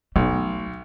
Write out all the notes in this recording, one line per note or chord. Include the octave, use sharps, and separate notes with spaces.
B1 A3